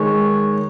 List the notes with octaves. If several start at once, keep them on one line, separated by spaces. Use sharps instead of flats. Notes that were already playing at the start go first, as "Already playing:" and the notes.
Already playing: D#3 G#3 D#4 C#5